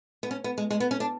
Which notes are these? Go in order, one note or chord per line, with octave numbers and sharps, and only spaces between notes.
B3
C#4
B3
G#3
G#3
B3
C#4
D4